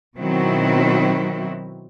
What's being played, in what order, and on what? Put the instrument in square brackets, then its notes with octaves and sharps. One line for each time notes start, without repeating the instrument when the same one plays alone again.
[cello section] B2 D#3 F#3 C4 E4 F#4